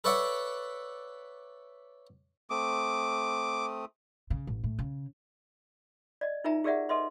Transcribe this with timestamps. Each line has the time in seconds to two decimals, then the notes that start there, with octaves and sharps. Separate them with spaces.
0.04 A4 B4 C#5 D5 E5 F#5
2.50 A3 C4 D6 D#6
4.30 C#3
4.47 A1
4.64 A2
4.79 C#3
6.21 D5 D#5
6.44 D#4 F4 A#4 E5 G#5 A#5
6.64 G4 G#4 A#4 D5 E5 F#5
6.89 A4 B4 D#5 E5 C6